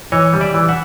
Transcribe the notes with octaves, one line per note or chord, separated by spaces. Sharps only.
E3 C#5 D#5
G3
D5 E5
E3
E5 F#5